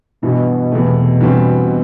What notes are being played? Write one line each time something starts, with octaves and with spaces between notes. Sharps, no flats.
G2 B2 E3 B3 E4
E2 C3 E3 A3
G2 E3 G3 C4 F#4